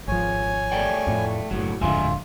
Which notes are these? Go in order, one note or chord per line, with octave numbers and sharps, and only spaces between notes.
G#1 F3 C#5 G#5
A3 D5 G5
F2 A2
F#1 A2 F#3
D1 F2 G#2 D3 F4 E5 G#5